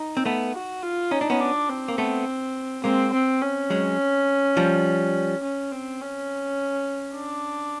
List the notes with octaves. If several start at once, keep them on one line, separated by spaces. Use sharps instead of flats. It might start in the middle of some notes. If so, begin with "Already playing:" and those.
Already playing: D#4
C4
A3 B3
F#4
F4
C#4 D#4
D4
B3 C#4
D4
C4
A#3
A3 B3
G#3 A#3 C4
C4
C#4
F#3 G#3
F3 G3
C#4
C4
C#4
D4